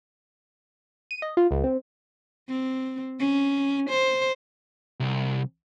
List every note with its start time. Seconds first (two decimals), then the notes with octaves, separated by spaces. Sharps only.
1.11 D#7
1.22 D#5
1.37 F4
1.51 C#2
1.64 C4
2.49 C4
3.20 C#4
3.90 C5
5.00 C2